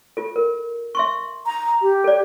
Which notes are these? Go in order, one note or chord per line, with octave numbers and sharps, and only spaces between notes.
F4 A4
A#4
E5 C6 C#6
A#5
G4
A4 D5